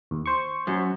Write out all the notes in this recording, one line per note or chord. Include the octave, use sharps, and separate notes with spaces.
D#2
C5 C#6
F#2